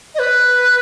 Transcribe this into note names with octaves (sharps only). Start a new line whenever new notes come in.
D#5
B4